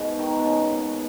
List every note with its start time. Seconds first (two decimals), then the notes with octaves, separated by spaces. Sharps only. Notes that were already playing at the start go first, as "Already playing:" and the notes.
Already playing: G#2 B2
0.19 D#3
0.39 B2
0.45 C#3
0.72 B2